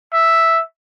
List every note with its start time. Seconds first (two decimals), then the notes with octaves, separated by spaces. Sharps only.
0.13 E5